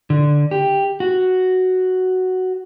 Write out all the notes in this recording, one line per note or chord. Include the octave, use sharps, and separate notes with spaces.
D3
G4
F#4